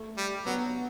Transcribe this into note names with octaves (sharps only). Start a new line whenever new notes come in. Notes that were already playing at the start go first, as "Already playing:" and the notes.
Already playing: A3
G3
F#3 B3